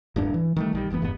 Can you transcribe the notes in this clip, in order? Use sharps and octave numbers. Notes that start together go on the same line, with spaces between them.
D1 G2 D4
E3
D#3 G3 A3
A#1 D#3 G3
F#1 D2 E3 B3
E1 G2 B3